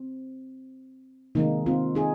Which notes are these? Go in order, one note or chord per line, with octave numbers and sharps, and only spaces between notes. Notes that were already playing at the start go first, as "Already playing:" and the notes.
Already playing: C4
C3 D#3 G#3 A#3 D#4
C4 F4
D#4 G#4